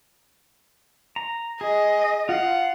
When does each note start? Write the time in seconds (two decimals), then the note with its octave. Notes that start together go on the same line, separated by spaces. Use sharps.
1.16 A#5
1.61 G#4 D#5
2.29 F4 F5 F#5